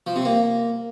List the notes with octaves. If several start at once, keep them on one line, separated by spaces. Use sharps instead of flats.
F3
C3
A#3